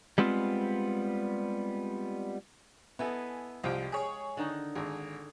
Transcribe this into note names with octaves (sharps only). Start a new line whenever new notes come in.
G3 G#3 B3 C4 F4
B3 E4 A4 D#5 G#5
C2 F3 G#3 F5 G5
G#4 C#5
D3 D#3 D#4
G#1 G#4